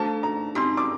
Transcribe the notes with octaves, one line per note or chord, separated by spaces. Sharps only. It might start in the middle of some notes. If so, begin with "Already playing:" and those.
Already playing: A3 D4 F#4 A4 C5 A5
A#5
C4 D#4 G4 C6
D6